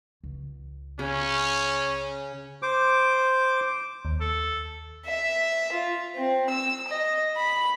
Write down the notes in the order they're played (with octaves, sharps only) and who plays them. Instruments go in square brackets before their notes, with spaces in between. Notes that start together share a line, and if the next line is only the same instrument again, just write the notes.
[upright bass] C#2
[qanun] C#3 [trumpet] C#4
[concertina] C5 D6
[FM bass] D#2
[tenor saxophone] A4
[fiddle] E5
F4
C4
E6
D#5
B5